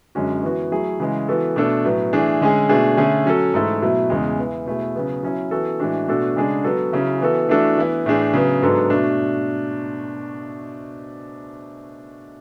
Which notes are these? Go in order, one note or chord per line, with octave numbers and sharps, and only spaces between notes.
F#2 D3 G#3 C#4 F#4
E3 B3 F#4
F#3 A3 E4 G#4
C#3 E3 G#3
E3 B3 F#4 A4
B2 A3 D4 A4
A2 F#3 B3
E3 A3 D4 G#4
D3 G#3 C#4 G#4
B2 A3 D4 G#4
D3 A3 C#4 G#4
F#3 C#4 F#4 A4
G#2 E3 A3 E4 A4
B2 F#3 A3 E4
E2 C#3 E3 G#3
E3 B3 E4
B2 A3 E4 G#4
C#3 F#3 B3
F#3 C#4 E4
E3 B3 F#4 A4
A2 E3 G#3 D4 F#4
B2 A3 D4 F#4 A4
C#3 G#3 D4 G#4
F#3 B3 F#4 A4
C#3 F#3 C#4 E4
E3 B3 F#4 A4
E3 A3 D4 F#4 A4
E3 B3 E4
A2 E3 A3 D4 G#4
C#3 F#3 B3
G#2 F#3 B3 D4 A4
B2 A3 D4 F#4